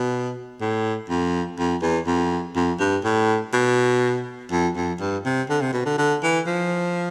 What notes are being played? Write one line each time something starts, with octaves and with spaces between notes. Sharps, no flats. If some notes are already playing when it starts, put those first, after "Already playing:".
Already playing: B2
A2
F2
F2
E2
F2
F2
G2
A2
B2
F2
F2
G2
C3
D3
C3
B2
D3
D3
E3
F3